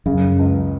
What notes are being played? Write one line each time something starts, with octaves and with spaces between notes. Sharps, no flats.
F#2 C#3
C#2